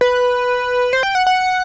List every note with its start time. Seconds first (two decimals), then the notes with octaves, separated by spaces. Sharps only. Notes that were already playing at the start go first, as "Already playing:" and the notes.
0.01 B4
0.93 C5
1.03 G5
1.15 F#5
1.27 F#5